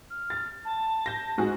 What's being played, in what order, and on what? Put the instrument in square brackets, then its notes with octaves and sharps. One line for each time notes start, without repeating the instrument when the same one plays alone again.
[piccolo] F6
[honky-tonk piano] A6
[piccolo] A5
[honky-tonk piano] G6 A#6
G#2 F#4 G#4